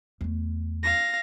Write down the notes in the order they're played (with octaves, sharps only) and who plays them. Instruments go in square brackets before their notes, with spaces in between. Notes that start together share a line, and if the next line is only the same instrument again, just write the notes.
[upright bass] E2 A3
[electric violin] F5 A#6